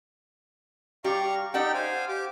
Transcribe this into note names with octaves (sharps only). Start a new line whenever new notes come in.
G3 G4 F5 A#5 C#6
D#4 G4 A4 D5 F#5 G5
C5 F5 G#5
G4 D6